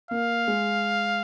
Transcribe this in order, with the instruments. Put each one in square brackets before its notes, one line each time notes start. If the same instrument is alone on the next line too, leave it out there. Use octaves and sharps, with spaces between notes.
[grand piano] A#3 [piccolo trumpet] F5
[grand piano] G#3